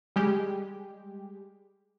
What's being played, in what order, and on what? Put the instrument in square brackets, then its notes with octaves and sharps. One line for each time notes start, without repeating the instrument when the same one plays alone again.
[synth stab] G3 G#3 G4